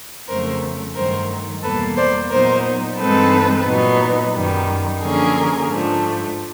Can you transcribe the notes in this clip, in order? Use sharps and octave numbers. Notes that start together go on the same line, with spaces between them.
F2 C#3 F#3 A3 A#4 C5
G2 D#3 F#3 A3 A#4 C5
E2 B2 G3 A#3 A4 B4
C5 D5
A#2 F#3 B3 D#4 A#4 C5
G2 E3 G#3 C4 D#4 A4 B4
A#2 F#3 B3 D#4
F#2 D#3 G3
D3 F3 A#3 C#4 G#4 A#4
G#2 F3 A3 D4